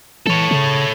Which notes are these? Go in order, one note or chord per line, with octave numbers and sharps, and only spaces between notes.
E3 A4 C#5
C#3